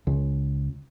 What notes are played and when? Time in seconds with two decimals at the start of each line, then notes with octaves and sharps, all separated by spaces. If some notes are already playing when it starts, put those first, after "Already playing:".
0.07 C#2